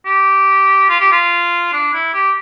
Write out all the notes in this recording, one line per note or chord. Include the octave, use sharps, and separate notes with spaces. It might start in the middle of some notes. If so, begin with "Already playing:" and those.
G4
F4
G4
F4
D4
E4
G4